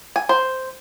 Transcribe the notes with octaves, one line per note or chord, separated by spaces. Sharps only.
G#5
C5